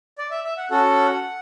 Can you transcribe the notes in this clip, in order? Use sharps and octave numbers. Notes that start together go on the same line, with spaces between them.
D5
E5
E5
F#5
C#4 F#4 A4 F#5